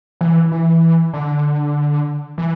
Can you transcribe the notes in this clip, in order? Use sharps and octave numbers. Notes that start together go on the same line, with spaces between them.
E3
E3
D3
E3